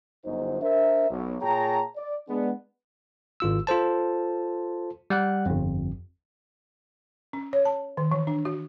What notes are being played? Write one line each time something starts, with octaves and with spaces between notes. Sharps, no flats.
G1 F#2 D#4 C5
D4 A#4 C5 E5
B1
A#2 G#4 C#5 G5 A5 A#5
D5
G#3 B3 D4
G#1 F4 E6
F4 A4 C5 A5
G3 F#5 F#6
G1 F2
C#4
C#5
A5
D#3
E3
D4
F#4